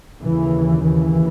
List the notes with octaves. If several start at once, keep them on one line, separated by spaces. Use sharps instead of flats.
D#2 C#3 E3
E3